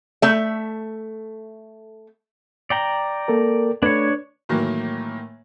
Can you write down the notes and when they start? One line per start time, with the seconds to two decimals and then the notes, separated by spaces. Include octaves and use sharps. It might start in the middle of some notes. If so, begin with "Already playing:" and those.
0.22 A3 E5
2.70 D5 G5 A#5
3.28 A#3 A4 A#4
3.83 A3 D4 B4 C#5 G#6
4.49 A2 D#3 E3 F#3 A#3